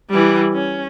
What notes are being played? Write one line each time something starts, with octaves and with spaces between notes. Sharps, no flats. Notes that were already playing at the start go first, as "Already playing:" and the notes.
E3 G3
C#4